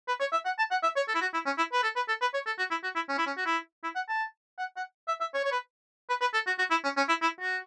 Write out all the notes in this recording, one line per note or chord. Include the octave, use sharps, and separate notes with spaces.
B4
C#5
E5
F#5
A5
F#5
E5
C#5
A4
E4
F#4
E4
C#4
E4
B4
A4
B4
A4
B4
C#5
A4
F#4
E4
F#4
E4
C#4
E4
C#4
F#4
E4
E4
F#5
A5
F#5
F#5
E5
E5
C#5
C#5
B4
B4
B4
A4
F#4
F#4
E4
C#4
C#4
E4
E4
F#4